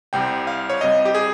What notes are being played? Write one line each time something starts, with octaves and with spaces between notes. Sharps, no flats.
C2 C3 G3 G5
F5
C#5
C2 C3 G3 D#5
G4
G#4